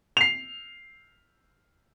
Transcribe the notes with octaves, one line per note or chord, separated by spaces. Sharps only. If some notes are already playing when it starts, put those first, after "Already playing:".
C7 F7